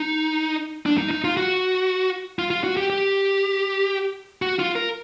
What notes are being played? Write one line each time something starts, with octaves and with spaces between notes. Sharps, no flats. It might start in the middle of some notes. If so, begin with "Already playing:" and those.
Already playing: D#4
D4
D#4
D#4
F4
F#4
F4
F4
F#4
G4
G4
F#4
F4
A#4